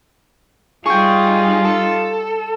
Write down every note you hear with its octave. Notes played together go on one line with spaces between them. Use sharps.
G3 D#4 F4 G#4 G5 C#6
A4